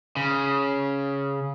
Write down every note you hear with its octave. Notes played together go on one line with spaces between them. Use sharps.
C#3